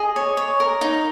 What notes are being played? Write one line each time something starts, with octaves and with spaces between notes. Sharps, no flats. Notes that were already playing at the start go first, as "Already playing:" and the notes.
Already playing: G#4 D#5
C#5
C#5
A#4
D#4